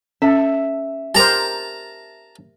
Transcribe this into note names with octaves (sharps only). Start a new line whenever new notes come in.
C#4 A4 E5
G4 A#4 C5 A5 A#5